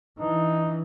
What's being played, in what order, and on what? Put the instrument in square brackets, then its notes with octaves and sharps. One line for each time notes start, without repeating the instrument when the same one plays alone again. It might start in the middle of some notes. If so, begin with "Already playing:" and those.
[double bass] E3 [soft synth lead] D4 [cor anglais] D#4